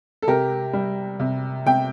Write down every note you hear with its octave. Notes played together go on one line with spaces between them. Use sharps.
A4
C3 G4 A#4
G3
C3
C3 G5